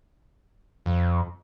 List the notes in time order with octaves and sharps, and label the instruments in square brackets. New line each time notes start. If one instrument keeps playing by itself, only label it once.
[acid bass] F2